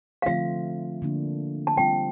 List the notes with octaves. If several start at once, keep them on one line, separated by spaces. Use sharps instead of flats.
F5
D3 F3 A3 C4 F4 E5
D3 F3 A#3 D4
A5
G3 C4 F4 G5